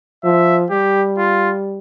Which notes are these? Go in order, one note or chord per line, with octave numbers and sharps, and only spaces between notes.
F3 E5
G3 G4
F4